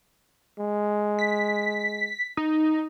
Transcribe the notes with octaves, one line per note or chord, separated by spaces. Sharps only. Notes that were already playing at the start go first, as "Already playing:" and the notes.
G#3
B6
D#4